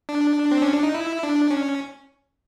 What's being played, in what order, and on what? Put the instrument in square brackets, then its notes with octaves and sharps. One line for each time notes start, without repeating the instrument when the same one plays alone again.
[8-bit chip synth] D4
C4
C#4
D4
D#4
E4
D4
C#4